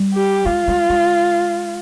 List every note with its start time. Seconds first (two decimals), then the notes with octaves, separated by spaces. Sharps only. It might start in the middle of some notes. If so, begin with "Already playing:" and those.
Already playing: G3
0.14 G4
0.46 G#3 F4
0.68 G#3
0.90 G#3